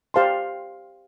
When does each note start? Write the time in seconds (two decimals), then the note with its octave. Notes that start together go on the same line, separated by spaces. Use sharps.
0.14 G4 C5 F5 A5 C6